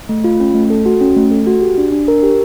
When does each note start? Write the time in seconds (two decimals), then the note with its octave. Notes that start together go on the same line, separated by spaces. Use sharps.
0.09 A3
0.24 F4
0.40 C#4
0.54 A3
0.70 A4
0.86 F#4
1.01 C#4
1.16 A3
1.31 A4
1.47 F#4
1.62 G4
1.78 D4
1.92 D4
2.08 A#4
2.23 G4